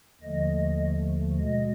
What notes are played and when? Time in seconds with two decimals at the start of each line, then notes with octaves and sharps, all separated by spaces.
0.21 D#2 D3 F3 A3 D#5
1.38 B2 G#3 D#5